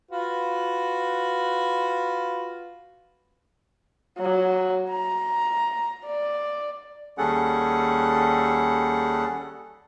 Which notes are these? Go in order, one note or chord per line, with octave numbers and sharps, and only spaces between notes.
F4 F#4 B4
F#3
A#5
D5
D#2 G3 C#4 G#4 A4 F#5